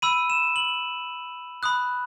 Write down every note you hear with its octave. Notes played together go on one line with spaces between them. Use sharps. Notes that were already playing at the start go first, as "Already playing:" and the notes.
B5 E6 D#7
E7
F#7
B5 D#6 F#6